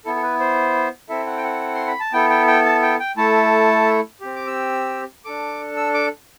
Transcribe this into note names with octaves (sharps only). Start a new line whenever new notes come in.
B3 E4 A4
A4
B4
C5
C4 E4 A4 E5
F#5
G5
F#5
C6
B5
A5
B3 E4 A4 G5
G5
G5
A5
G5
G5
A3 E4 A4 A5
C4 G4
D6
E6
D4 A4 D6
E6
D6